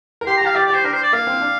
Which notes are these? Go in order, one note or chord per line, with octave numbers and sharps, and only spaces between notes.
A#4
G4 C6
A#5
G4 F5
G4 D5
D5
G4 C5
D4 A#4
C5
D5
A#3 F5
C4
D4